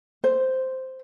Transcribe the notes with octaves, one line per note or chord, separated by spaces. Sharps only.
C5